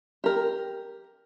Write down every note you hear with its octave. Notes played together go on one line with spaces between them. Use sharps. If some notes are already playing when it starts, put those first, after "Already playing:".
G4 A#4